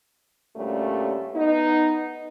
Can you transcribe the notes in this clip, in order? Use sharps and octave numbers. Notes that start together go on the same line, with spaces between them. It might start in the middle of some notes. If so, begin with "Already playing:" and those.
D2 A#2 G3 A3 C#4
B3 D#4